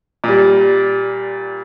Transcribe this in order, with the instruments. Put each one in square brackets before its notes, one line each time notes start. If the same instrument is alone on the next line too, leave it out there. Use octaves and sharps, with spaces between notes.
[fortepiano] A#2 G3